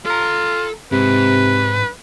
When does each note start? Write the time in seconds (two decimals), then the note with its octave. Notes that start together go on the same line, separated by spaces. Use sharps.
0.05 F4 A4 A#5
0.92 G#2 C3 B4